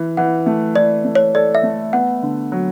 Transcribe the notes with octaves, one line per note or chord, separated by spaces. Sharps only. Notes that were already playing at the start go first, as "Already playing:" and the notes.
Already playing: E3
E3 F#5
A3
E3 D5
A3
C#5
A4 D5
E5
A3
B3 F#5
D3
F#3